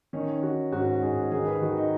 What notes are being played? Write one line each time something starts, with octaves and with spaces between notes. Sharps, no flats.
D#3 C#4
D#3 F#4
G#2 F#4
G#2 G#4
D#3 G#4
B4
D#3 F#4
D#4